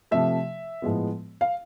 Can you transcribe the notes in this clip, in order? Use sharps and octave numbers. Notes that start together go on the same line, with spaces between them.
C3 F3 A3 E5
A2 F3 G#3 B3
F5